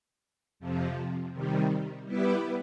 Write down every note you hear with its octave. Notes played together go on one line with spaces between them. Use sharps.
F2 C3 F3
C3 D#3 G3
G3 B3 E4 G4 B4